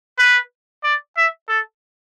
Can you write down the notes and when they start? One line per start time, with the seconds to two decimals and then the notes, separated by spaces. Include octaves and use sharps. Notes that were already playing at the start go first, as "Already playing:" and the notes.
0.18 B4
0.84 D5
1.17 E5
1.49 A4